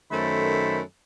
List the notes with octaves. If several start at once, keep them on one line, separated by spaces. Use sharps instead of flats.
F#2 D#3 A3 A4 C5 B5